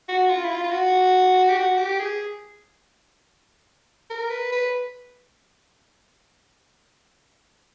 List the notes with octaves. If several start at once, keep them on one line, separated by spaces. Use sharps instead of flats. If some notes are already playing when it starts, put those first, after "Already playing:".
F#4
F4
E4
F4
F4
F#4
G4
F#4
G4
G#4
A#4
B4
B4